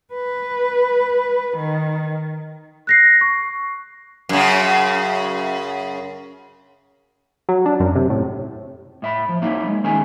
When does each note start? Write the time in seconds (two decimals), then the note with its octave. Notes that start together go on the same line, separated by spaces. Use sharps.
0.14 B4
1.57 D#3
2.87 F#6 A#6 C7
3.21 C#6
4.29 F#2 C#3
7.49 F#3
7.66 D4
7.80 F#2
7.95 C3
8.10 A2
9.02 A2 E5 B5
9.29 F3
9.42 F#3 A#3 D#4 E4
9.67 G#3
9.84 D#3 C#4 D#4 G#4 G#5